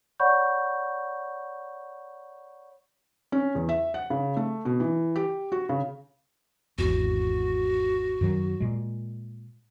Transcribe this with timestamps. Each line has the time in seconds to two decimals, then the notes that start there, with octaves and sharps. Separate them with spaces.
0.20 C#5 D5 F#5 B5 C#6 G6
3.32 C#4
3.55 E2
3.69 E5
3.94 F#5
4.10 C#3
4.37 A3
4.65 B2
4.80 E3
5.16 G4
5.52 F#4
5.69 C#3
6.78 G#1 E2 F#4
8.21 F#2 D#3 F#3
8.60 A#2 G#3